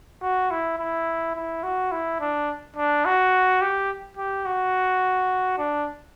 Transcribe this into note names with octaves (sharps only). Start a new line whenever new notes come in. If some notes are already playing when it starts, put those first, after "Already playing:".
F#4
E4
E4
E4
F#4
E4
D4
D4
F#4
G4
G4
F#4
D4